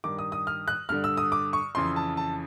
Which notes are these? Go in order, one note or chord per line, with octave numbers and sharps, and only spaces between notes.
G2 D#3 D6
D#6
D#6
F6
F#6
G2 D3 F6
E6
D#6
D6
C#6
F2 C#3 E3 C6
A5
A5